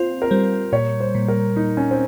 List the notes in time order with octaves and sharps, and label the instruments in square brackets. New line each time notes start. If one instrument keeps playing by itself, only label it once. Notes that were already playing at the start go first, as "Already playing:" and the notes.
Already playing: [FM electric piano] C4 F4 [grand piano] C5
[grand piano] A#4
[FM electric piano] G3 [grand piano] C5
[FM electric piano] A#2 [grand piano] C#5
[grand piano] C5
[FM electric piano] A#2
[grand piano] A#4
[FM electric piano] A#2 [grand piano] D#4
[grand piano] C#4
C4